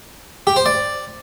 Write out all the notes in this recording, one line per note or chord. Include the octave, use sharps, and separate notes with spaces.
G4
C5
D5